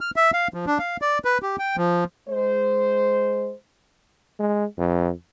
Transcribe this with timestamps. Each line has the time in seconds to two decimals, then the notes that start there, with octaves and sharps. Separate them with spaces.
0.01 F6
0.16 E5
0.33 F5
0.54 F3
0.67 D4
0.79 F5
1.02 D5
1.25 B4
1.42 G4
1.59 G5
1.77 F3
2.29 G#3 C5
4.40 G#3
4.78 F2